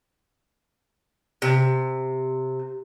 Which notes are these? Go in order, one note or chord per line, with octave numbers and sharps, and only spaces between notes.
C3